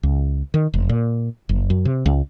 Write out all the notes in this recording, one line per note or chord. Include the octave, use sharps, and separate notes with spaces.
C#2
D#3
F1
A#2
F#1
F#2
C3
C#2